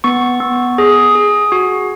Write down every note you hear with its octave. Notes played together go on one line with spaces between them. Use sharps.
B3 C#6
B3
G#4
G#4
F#4